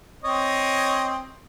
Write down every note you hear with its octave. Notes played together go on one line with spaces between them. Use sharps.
C4 C#5 D#5